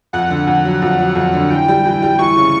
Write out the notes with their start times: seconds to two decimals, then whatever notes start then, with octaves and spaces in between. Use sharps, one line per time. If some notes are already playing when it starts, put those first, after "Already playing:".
0.13 F2 F#5
0.30 D3
0.47 F2
0.65 F#3
0.82 F2
0.99 F#3
1.15 F2
1.34 D3
1.50 E3 G5
1.68 G3
1.85 E3
2.02 G3
2.19 E3 C#6
2.36 C#3